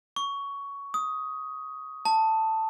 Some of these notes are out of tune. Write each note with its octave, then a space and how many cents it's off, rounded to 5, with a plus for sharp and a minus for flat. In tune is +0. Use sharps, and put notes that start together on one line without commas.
C#6 +15
D#6 +15
A5 +10